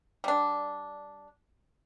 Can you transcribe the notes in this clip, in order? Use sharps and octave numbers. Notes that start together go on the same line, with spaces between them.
G3 D4